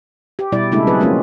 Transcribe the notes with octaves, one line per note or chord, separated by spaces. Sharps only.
G4
B2 G3 E4 D5
C#3 G#3 A3 D4 E4
F#3 C4 G#4 B4
F3 G#3 A#3 C4 C#4 F4